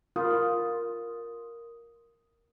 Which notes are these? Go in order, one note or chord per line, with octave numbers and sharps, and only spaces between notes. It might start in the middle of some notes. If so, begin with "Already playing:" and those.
F4 A#4 D#6